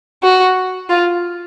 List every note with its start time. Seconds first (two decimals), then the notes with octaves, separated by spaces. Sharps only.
0.23 F#4
0.89 F4